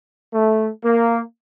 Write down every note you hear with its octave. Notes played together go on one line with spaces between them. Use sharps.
A3
A#3